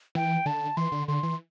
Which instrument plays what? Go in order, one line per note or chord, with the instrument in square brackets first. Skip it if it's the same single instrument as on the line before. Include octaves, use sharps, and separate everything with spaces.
[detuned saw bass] E3 [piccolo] G5
[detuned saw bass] D3 [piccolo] A5
[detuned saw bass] E3 [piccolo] C6
[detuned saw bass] D3
[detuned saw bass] D3 [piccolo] C6
[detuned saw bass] E3